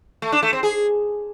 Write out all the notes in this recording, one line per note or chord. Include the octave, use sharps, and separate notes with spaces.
A3
D4
A3
C4
G#4